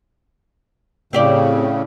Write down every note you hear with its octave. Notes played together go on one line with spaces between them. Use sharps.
A2 C#3 C4 G4 D5